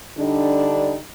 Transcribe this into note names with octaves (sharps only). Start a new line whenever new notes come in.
D3 G3 D4 D#4